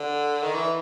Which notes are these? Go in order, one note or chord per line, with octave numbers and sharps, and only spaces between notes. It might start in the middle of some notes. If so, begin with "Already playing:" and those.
Already playing: D3
D#3
E3